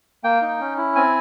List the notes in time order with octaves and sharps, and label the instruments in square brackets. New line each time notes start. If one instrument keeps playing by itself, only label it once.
[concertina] A#3 G5
D#4
C#4
E4
C4 G#5